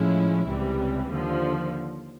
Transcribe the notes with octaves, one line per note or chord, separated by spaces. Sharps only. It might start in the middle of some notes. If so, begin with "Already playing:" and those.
Already playing: A2 F3 G#3 C#4 E4
C#2 C3 E3 G3
D#2 D3 F3